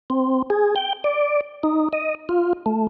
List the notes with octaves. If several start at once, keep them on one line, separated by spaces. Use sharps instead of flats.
C4
G#4
G5
D5
D#4
D#5
F4
A3